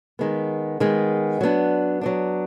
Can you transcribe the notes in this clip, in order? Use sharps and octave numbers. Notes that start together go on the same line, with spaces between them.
D#3 G#3 B3
D#3 G#3 B3
F#3 B3 D4
F#3 B3 D4